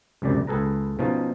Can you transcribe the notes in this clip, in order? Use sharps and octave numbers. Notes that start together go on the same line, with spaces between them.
C#2 F#2 C3 D5
C#2 G#4 A4 B4 A#5
B2 F3 C#4 D#4